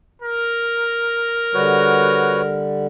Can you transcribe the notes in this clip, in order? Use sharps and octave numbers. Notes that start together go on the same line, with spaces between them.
A#4
D3 G3 F#4 B4 C#5